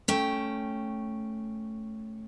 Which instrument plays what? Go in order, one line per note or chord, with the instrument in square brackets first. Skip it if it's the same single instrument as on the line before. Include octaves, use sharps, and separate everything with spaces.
[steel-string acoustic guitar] A3 C#4 G5